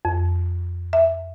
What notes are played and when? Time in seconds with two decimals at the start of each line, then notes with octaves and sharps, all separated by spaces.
0.05 F2
0.93 E5